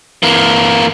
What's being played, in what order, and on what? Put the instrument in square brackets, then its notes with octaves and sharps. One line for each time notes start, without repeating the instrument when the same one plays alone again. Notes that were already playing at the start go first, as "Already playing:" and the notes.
[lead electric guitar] E3 A#3